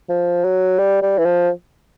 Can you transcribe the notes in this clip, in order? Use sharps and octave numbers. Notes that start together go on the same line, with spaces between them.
F3
F#3
G3
G3
E3
F3